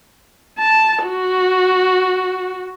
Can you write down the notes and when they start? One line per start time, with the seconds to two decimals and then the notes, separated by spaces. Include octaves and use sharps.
0.59 A5
1.05 F#4